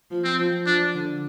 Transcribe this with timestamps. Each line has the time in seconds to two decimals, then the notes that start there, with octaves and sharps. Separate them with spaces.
0.11 F3
0.24 C4
0.38 F3
0.66 F3 D4
0.94 D3